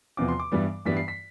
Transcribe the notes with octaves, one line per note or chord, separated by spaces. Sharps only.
E2 C3 F3 B3 D6
C6
D6
G2 E3 G3 B3
G2 E3 G3 B3 B6
C7
B6